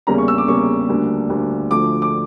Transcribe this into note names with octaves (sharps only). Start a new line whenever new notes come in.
E2 C#3 G3 A#3 C#4 A#5
C#6
E6
D6
E2 C#3 G3 A#3 C#4 C#6
D2 D3 G3 A#3 D4
D2 D3 G3 A#3 D4
D2 D3 F3 A3 D6
D6